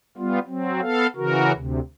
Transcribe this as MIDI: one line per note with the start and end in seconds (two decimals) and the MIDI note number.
0.18 0.39 55
0.18 0.39 59
0.18 0.39 65
0.47 0.81 54
0.47 0.81 60
0.81 1.07 59
0.81 1.07 69
0.81 1.07 77
1.16 1.52 49
1.16 1.52 52
1.16 1.52 66
1.16 1.52 70
1.54 1.80 38
1.54 1.80 48